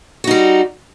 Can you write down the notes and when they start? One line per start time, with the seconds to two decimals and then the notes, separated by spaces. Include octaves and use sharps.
0.24 F#4
0.27 D#4
0.31 G3